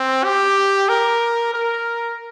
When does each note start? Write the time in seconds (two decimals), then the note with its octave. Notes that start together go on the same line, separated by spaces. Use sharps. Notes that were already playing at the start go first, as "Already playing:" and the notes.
Already playing: C4
0.24 G4
0.89 A#4
1.53 A#4